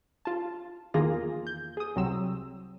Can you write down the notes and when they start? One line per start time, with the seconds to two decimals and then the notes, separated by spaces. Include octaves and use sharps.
0.25 F4 A5
0.94 E2 D#3 A#3 F4 G#4 A#6
1.47 G6
1.77 G#4 D#6
1.96 C2 F#3 C4 E6